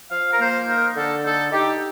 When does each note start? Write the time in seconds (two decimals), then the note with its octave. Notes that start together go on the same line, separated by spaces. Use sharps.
0.09 F3 F5
0.31 A#4
0.38 A#3 C5
0.66 D#4 A#4
0.95 D3 A4
1.24 D#4 A4
1.52 D#4 G4